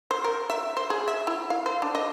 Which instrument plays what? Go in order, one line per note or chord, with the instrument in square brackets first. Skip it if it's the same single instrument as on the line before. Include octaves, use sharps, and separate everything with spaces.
[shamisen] C5
A#4
E5
C5
G#4
E5
E4
F5
C5
D4
D#5